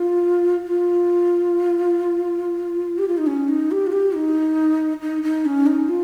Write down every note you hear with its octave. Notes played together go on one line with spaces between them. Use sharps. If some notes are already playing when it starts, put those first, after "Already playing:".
Already playing: F4
F4
G4
F4
D#4
C#4
D#4
G4
F4
G4
D#4
D#4
D#4
C#4
D#4
F4